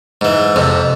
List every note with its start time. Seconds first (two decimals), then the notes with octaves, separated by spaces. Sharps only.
0.21 G#2 E3
0.56 F2 C3